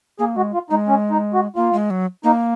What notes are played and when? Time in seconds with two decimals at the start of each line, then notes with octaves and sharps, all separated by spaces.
0.19 A#3 G#4
0.36 G#3 F#4
0.54 F4
0.70 G#3 D#4
0.88 C#4
1.11 D#4
1.34 F#4
1.56 A#3 F4
1.73 G#3
1.90 F#3
2.24 A#3 D#4